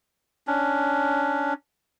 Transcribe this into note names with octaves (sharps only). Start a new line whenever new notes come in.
C#4 D4